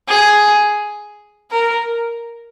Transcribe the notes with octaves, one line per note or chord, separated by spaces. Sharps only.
G#4
A#4